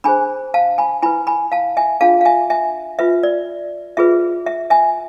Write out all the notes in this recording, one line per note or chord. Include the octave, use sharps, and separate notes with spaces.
D4 G#4 C5 G#5 B5
F5 A5
G#5 B5
E4 B4 G#5 B5
G#5 B5
F5 A5
E5 G#5
D4 F4 G#4 F5 A5
F5
E5 G#5
E5 G#5
F4 B4 E5
D5
F4 G#4 B4 E5
E5
E5 G#5